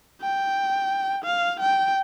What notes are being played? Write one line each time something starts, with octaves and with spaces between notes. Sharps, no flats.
G5
F5
G5